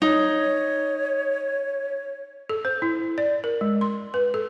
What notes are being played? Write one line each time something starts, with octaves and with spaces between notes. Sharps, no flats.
D#4 C#5
A4
C5
E4
D5
A#4
G#3
C6
B4
A4